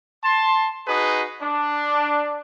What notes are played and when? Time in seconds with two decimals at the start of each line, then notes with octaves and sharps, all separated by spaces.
0.23 A5 C6
0.87 D#4 F#4 G#4 B4
1.40 D4